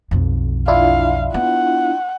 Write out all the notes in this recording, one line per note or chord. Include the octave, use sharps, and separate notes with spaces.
B1 F2
D4 E4 F4 F5
B3 F#5